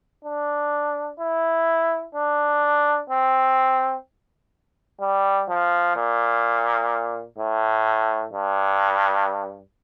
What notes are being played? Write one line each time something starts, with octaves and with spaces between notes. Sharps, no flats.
D4
E4
D4
C4
G3
F3
A#2
A2
G2